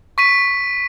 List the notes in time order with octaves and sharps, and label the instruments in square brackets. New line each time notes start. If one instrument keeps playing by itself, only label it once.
[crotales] C#6 B6 D#7